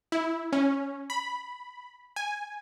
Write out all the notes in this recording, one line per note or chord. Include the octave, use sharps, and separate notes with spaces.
E4
C#4
B5
G#5